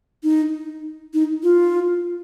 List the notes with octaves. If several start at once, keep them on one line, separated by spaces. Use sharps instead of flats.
D#4
D#4
F4